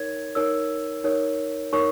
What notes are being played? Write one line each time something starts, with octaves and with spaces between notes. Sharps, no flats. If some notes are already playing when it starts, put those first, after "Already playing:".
Already playing: D#4 A#4 C#5 G#6
D#4 A#4 C#5 E6
D#4 A#4 C#5
D#4 A#4 C#5 C#6